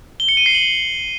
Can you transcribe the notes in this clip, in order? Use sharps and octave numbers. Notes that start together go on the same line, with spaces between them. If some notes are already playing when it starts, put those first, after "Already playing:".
G7
C#7
D#7
C7
F#7